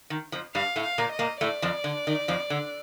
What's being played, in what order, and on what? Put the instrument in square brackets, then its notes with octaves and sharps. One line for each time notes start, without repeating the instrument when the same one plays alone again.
[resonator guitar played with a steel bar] D#3
F2 F3
[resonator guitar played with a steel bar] G2 G3 [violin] F5
[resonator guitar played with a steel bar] A2 A3
[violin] F5
[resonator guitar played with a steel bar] A#2 A#3
[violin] D#5
[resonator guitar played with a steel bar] A#2 A#3
[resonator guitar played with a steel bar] A2 A3 [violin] D5
[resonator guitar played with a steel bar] F2 F3
D3
D#3
F2 F3
D3